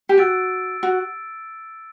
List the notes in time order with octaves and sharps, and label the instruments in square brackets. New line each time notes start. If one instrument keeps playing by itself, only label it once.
[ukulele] G4
[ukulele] F#4 [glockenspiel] E6 A6 D7
[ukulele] F#4